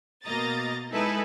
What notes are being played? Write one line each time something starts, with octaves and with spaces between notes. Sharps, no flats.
B2 A#3 D#5 A#5 A6
G#3 D#4 E4 A4 B4 G#5